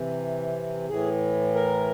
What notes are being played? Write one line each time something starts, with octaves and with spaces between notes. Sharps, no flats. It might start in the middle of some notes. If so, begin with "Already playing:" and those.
Already playing: C3 E3
A2 E3 G#4
A#4